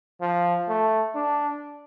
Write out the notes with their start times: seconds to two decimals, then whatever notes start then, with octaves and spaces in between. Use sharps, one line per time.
0.21 F3
0.69 A3
1.15 D4